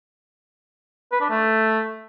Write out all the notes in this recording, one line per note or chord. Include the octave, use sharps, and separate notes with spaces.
B4
D4
A3